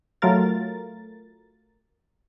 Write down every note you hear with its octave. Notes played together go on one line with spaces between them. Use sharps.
F#3 A3 F4 A#4 A6